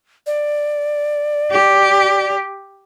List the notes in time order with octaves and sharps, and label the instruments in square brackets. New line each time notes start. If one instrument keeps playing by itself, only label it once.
[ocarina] D5
[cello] G4